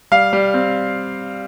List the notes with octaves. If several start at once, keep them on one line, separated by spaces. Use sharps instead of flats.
G3 F5
G3
C4